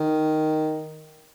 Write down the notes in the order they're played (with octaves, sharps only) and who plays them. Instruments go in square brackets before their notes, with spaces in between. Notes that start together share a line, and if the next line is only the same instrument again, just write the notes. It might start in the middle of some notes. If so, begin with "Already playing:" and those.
Already playing: [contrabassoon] D#3